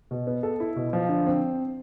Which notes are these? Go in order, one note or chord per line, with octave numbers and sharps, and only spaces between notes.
B2
B3
A4
E4
B2
F3
D3
C4